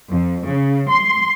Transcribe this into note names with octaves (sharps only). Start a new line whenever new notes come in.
F2
C#3
C6